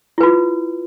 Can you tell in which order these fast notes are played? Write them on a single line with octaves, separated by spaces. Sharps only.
E4 B4 F4